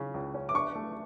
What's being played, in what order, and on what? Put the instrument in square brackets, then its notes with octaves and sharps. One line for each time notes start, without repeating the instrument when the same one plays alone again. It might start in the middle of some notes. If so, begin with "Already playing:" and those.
Already playing: [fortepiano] C#3 C#4
C#2
C#4
[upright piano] D6
[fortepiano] D4 [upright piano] C#6
[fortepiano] A3